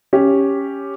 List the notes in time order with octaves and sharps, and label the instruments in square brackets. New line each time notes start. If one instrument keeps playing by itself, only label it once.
[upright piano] C#4 G4